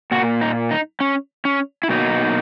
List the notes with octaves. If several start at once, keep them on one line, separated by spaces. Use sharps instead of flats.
A#2 A#3 F#4
D#4
D#4
C#4
C#4
E4
B2 F#3 A#3 D#4